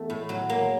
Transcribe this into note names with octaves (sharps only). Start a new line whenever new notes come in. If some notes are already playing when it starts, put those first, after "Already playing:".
Already playing: E2 A3
A2
F#3
A#3